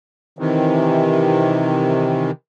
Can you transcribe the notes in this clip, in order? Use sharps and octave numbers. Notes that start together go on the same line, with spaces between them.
C3 D#3 E3